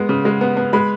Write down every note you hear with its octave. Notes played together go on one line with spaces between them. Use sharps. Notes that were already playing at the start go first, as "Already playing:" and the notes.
Already playing: G#3 B3
C#3
G#3
B3
B3
G#3 B5